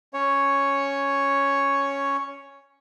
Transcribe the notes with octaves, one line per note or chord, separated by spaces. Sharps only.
C#4 C#5